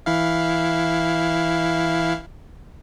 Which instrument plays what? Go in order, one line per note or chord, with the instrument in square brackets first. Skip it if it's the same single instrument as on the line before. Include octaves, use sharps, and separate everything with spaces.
[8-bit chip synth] E3 E4 F5